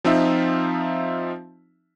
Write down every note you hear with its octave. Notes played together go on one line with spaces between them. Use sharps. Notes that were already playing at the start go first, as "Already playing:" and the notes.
F3 C4 D#4 F4 E5